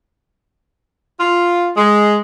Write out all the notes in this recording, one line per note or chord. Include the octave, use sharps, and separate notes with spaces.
F4
G#3